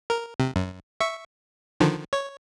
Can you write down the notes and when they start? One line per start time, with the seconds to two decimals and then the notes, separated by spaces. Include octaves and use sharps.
0.10 A#4
0.40 C3
0.56 F#2
1.01 E5 C#6
1.80 D3 D#3 F3
2.13 C#5